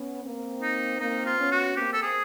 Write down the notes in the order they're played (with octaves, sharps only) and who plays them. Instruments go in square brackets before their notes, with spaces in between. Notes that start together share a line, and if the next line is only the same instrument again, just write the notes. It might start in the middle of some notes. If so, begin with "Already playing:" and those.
Already playing: [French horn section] B3 C#4
A#3 C4
[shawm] D#4
[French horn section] A#3 C4 [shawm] D#4
[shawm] F4
[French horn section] B3 C#4
[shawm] F#4
[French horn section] A#3 C4 [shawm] G4
[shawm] A4
G#4